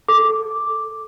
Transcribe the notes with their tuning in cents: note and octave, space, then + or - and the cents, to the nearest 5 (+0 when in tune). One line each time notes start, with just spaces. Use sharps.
A4 +0 D6 +0